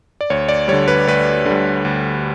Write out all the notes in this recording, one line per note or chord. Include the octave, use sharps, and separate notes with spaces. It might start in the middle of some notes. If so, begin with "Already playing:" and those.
D5
D2 C#5
D5
D3 G3 C#5
B4
D2 B4
D3 G3
D2